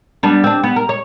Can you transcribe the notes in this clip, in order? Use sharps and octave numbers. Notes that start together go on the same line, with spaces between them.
G3 B3 D4
C4 D4
B3
A#4
C#5